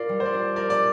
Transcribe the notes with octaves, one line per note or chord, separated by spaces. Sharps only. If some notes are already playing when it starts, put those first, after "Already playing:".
Already playing: F4 A#4 D5
G3
C5
D5
D4
A#4 D5
D5